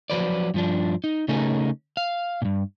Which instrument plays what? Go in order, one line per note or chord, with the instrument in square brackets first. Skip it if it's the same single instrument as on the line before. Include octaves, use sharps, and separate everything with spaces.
[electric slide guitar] F3 F#3 B4 C5 D5
G2 F3 D4
D#4
C#3 A3 C#4 D#4 G#4 A#4
F5
G2 A#2